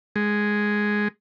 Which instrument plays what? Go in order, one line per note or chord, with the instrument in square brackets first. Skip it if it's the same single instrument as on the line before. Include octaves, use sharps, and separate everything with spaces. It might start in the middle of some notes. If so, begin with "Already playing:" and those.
[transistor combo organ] G#3